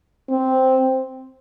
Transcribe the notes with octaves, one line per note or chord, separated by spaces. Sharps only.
C4